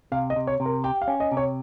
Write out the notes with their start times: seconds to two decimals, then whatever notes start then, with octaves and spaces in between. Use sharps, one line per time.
0.12 C3 F5
0.30 D#5
0.36 C3
0.47 C#5
0.60 C3
0.66 A#4
0.84 G4 G5
1.02 F5
1.08 C#4
1.20 D#5
1.32 C3
1.37 C#5